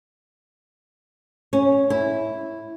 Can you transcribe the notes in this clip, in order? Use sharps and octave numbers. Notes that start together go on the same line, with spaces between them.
C#4
E4